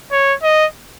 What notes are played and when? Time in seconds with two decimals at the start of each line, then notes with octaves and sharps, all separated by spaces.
0.11 C#5
0.43 D#5